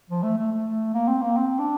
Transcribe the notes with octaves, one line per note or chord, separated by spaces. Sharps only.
F3
A3
A3
A3
A#3
C4
A#3
C4
D4